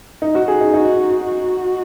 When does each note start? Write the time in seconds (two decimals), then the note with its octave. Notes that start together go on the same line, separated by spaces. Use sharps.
0.22 D#4
0.35 F#4
0.48 G#4
0.61 D#4
0.73 D#4 F#4
1.25 F#4